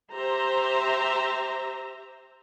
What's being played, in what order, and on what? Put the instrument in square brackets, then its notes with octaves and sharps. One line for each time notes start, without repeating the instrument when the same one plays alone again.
[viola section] G4 C5 E5 A#5